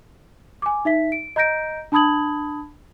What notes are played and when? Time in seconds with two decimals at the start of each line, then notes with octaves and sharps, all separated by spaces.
0.62 G#5 D6
0.85 D#4 E5 B6
1.12 D7
1.36 D#5 A#5 G6 A#6 D7
1.92 D4 A5 B5 D#6 G#6 F#7